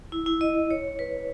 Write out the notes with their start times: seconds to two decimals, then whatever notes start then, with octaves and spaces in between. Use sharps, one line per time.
0.12 E4
0.26 E4
0.41 D#5
0.71 C#5
0.99 B4